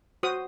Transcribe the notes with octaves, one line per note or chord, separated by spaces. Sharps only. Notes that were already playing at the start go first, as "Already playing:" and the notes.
F#4 C5 D#6